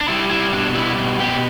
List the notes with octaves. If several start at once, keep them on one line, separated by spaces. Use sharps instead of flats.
D4
G3 E4
G3 E4
B2 D4
G3 E4
B2
B2 G4